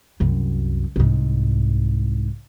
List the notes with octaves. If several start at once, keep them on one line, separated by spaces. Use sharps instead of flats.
C2 F#2
C2 G#2